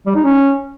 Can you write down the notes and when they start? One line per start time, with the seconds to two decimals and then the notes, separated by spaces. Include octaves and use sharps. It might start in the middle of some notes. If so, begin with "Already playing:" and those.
0.06 G3
0.15 D#4
0.24 C#4